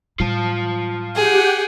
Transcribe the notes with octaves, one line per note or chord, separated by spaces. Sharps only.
A2 G3 F4 A5
G4 G#4 F#5 G5